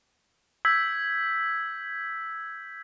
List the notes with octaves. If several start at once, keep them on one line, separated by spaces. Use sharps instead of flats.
E6 G6 G#6 B6